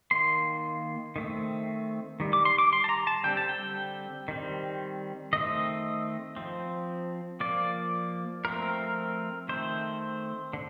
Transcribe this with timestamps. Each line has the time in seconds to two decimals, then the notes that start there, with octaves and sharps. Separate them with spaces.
0.11 D#3 A#3 C6
1.16 D#3 A3 C4
2.20 D#3 G3
2.33 D6
2.45 C6
2.58 D6
2.73 C6
2.84 A5
2.89 A#5
3.07 A5
3.24 D3 G3 C4 G5
3.37 A5
3.49 G5
4.28 D#3 G3 C4
5.33 D#3 A3 C4 D#5
6.36 F3 C4
7.40 F3 A#3 D5
8.45 F3 A3 C4 A#4
9.49 D#3 A3 C4 C5
10.53 D3